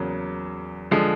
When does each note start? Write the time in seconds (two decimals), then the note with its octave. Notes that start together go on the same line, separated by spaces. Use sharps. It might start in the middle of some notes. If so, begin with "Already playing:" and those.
Already playing: E2 C#3 F#3 A#3
0.91 D3 F3 G#3